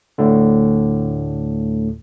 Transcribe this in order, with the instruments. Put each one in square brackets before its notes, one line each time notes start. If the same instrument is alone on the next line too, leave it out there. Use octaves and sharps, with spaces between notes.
[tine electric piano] D2 A2 D3